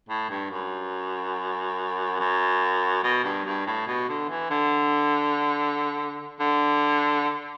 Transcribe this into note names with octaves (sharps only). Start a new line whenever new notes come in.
A2
G2
F#2
F#2
B2
G2
G2
A2
B2
D3
E3
D3
D3